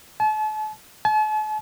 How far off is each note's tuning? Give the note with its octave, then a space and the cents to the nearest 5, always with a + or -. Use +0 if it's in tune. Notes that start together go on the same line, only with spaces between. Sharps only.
A5 -40
A5 -45